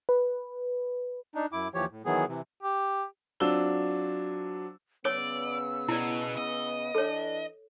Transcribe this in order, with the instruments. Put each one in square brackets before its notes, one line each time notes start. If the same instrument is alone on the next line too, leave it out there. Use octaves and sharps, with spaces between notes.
[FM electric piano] B4
[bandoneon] D4 D#4
F#2 E4 D6
D#2 E3 F3 G4 C#5
A2
D#3 E3 F#3 B3 G#4
C3 E3
[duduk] G4
[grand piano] F#3 C4 D4 F4 E6 G7
[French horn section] C#3 B3 [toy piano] C#5 D6 [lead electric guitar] D5 [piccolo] E6
[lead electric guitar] B2 [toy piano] E4 D5
[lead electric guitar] D#5
[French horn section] E3 D4 [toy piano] A4 C#5